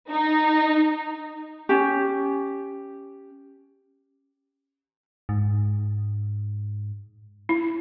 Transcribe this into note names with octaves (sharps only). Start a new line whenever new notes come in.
D#4
C#4 G4
G#2
E4